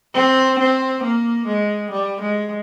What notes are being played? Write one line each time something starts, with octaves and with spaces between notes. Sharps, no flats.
C4
C4
A#3
G#3
G3
G#3